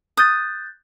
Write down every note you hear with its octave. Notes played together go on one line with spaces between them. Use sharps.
D#6 F#6 G6 A6